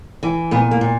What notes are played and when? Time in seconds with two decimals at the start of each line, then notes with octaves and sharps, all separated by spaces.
0.23 E3
0.51 A#2 B3
0.71 A#3
0.81 A#2